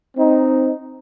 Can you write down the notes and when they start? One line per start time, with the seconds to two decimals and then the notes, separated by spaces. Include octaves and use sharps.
0.17 C4 D#4